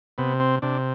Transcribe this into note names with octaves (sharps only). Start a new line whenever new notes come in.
C3 B3
C4
C3 D4